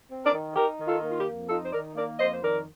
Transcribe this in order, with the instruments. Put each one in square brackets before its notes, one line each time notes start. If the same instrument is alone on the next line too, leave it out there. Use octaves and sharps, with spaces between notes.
[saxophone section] C4
A#4 D5
D#3
D#4 G4 A#4
D#3
F4 A4
A#3
F4
G4
F2
D#4 F4 A4
C5
D#3 A#4 D5
A#3 A#4 D5
F2 C5 D#5
C5
D#3 A#4 D5